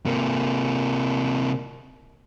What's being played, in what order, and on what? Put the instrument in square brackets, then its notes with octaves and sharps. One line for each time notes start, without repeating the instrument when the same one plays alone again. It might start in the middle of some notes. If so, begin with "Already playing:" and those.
[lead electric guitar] C3 A#3